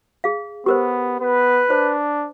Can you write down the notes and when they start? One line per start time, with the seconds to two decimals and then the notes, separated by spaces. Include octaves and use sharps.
0.24 G#4 F5
0.66 B3 G4 A#4 C5
1.21 B3 B4
1.70 D4 C5